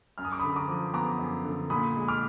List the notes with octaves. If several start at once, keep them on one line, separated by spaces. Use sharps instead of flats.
F#2 F6
D#6
D6
D3 B5 D#6
A#5 D6
F3
B3 A#5 D6
F#2
D3
A#2 B5 D#6
G#3
D6 F6